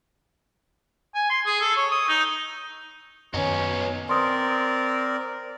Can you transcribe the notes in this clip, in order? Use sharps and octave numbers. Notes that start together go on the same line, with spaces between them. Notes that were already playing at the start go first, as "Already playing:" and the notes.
G#5
C6
G#4
A4
C#5
D#6
D#4
F#2 D#3 B3 C#4 D#4
C4 A#4 D5 C6 D#6